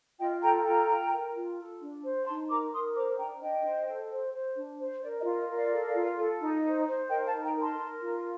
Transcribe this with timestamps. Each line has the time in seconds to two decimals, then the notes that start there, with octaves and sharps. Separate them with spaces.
0.19 F4 D#5 G5
0.42 A4 G5 A#5
0.65 F4 G5 A#5
0.89 F4
1.11 A#4
1.35 F4
1.58 A4
1.80 D4
2.03 C5
2.26 D#4 A5 C6
2.49 A#4 A#5 D6
2.72 A#4 C6 D#6
2.95 C5 A#5 D6
3.18 D4 G5 A#5
3.41 D4 D#5 G5
3.64 C5
3.87 A4
4.10 C5
4.34 C5
4.56 D4
4.79 C5
5.02 A#4 D5
5.20 D#5
5.25 F4
5.37 D#5
5.48 A#4
5.53 D5 F5
5.71 A4
5.94 F4
6.17 A4
6.40 D#4
6.64 C5
6.86 C5
7.09 A#4 D#5 G5
7.26 F5 A5
7.32 D#4
7.43 G5 A#5
7.55 A#4
7.61 A5 C6
7.78 A#4
8.01 F4